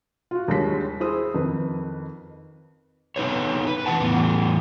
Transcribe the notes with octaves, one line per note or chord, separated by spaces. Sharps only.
F4 F#4
D#2 G3 G#3 D4 C#5 B6
E4 G#4 C5 D#6
F2 D#3 B4
C4 D#4 B4 C#5
B4
E3 F4 F#5 A5
E2 A2 B3